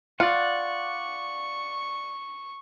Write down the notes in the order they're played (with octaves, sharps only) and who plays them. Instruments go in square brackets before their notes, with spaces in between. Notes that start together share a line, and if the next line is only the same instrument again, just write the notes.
[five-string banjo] F4 [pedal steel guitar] D5 F#5 [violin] C#6